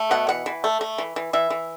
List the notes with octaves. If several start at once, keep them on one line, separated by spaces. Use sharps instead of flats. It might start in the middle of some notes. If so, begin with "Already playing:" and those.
Already playing: A3
B2 F#5
E3 F#5
E3
A3
A3
E3
E3
E3 E5
E3